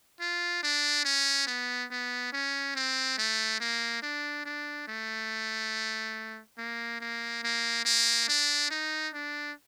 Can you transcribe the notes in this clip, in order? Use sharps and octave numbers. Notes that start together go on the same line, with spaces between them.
F4
D4
C#4
B3
B3
C#4
C4
A3
A#3
D4
D4
A3
A#3
A#3
A#3
A#3
D4
D#4
D4